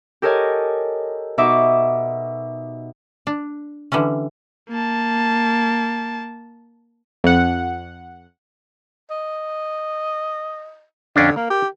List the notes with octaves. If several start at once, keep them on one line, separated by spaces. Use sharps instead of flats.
G4 A4 A#4 C#5 D#5 G#5
B2 D#4 E5 C#6 D6 E6
D4
D3 E3 G3 C#4
A#3 A5
F2 F#5
D#5
F2 D3 C#4 D4
A#3 A#4
G4